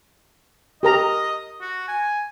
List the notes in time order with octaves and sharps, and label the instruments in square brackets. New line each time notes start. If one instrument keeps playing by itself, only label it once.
[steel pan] G4 A#4 A#5 [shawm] D#5
[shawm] F#4
G#5